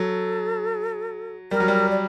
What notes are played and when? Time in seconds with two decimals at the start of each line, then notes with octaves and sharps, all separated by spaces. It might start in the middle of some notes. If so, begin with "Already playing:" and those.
Already playing: F#3 A4
1.51 G3 A#4
1.60 F#3
1.68 G3
1.90 D5